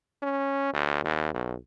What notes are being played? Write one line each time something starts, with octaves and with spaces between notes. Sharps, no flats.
C#4
D2
D#2
B1